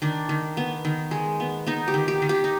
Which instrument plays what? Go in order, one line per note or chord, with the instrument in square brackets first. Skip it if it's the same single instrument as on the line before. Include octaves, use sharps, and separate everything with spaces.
[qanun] D#3 D4
D#3
B3
D#3
G#3
B3
B3 D#4
G4
D#3
G4
D#3
G4
D#4